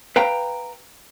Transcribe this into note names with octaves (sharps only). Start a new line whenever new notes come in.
B4 F5 G5 A#5